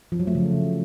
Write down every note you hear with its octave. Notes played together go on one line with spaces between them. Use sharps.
F3
F#3
A3
C#3